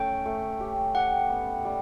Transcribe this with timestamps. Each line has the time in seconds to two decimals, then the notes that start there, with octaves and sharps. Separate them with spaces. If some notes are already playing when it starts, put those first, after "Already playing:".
Already playing: A3 C#4 G5
0.26 A3
0.61 G4
0.95 G4 F#5
1.30 B3
1.65 G3